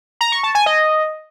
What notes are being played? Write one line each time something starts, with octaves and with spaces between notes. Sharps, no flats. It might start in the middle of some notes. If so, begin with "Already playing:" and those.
A#5
C#6
A5
G#5
D#5